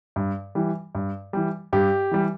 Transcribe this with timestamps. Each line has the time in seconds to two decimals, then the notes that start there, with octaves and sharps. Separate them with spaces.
0.16 G2
0.55 E3 G3
0.95 G2
1.33 E3 G3
1.73 G2 G4
2.11 E3 G3